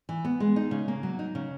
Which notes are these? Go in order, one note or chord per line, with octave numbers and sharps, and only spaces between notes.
E3
B3
G#3
D#4
C#3
A#3
F#3
D#4
C#3